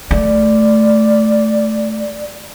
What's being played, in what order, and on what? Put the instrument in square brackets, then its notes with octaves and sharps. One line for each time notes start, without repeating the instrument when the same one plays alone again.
[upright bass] A3 [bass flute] D5